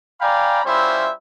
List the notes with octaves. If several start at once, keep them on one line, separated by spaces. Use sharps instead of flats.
D5 F5 G5 G#5 A#5 B5
G3 C#4 E4 F4 C5 E5